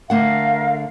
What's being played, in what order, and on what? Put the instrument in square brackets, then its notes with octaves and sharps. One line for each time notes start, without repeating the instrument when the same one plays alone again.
[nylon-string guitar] D3 A3 F#5 [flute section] A#4 F5